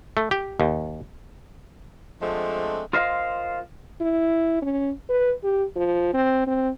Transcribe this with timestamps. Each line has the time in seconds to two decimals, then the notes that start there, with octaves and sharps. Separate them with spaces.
0.17 A3
0.31 G4
0.60 D#2
2.21 F3 G#3 A3 C4 D4
2.93 F4 A#4 C5 D#5 F5
4.01 E4
4.62 C#4
5.09 B4
5.44 G4
5.76 F3
6.14 C4
6.47 C4